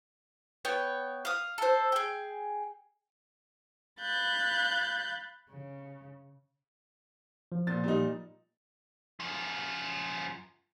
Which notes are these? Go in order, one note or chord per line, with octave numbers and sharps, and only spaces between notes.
B3 C#5 G5
F5 D#6
A4 C5
G#4 G5
F5 B5 F#6 G6 A6
C#3
F3
A#2 A6
A#2 G3 D#4
F#2 F3